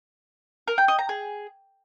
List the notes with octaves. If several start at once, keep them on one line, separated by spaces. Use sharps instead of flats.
A#4
G5
D#5
A#5
G#4